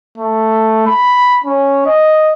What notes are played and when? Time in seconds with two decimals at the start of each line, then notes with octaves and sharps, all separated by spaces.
0.18 A3
0.87 B5
1.44 C#4
1.86 D#5